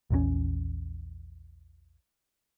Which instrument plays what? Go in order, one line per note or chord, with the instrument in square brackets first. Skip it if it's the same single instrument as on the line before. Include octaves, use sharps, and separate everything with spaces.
[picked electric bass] A#1 E2 D3 C#4